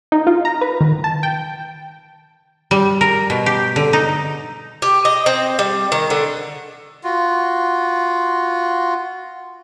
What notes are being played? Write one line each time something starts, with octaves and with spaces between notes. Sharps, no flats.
D#4
F4
A#5
B4
D#3
A5
G5
G3
A#4
B2
G4
D3
D#4
G4
D#5
C4
G3
D#3
D3
F4 F#4